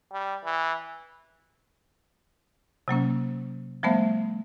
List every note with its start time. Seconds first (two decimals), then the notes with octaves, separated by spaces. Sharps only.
0.13 G3
0.45 E3
2.88 C3 F#3 A#3 C#4
3.83 F3 G3 A3 B3 C5 E5